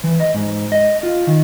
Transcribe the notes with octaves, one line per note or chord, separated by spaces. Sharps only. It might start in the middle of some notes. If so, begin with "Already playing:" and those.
E3
D#5
G#2
D#5
F4
D#3